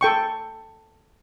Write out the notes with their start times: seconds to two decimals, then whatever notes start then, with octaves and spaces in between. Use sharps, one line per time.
0.01 A4 G5 C#6